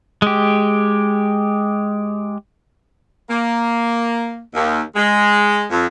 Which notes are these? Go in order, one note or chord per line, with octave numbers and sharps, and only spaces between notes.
G#3 G4
A#3
D#2
G#3
F2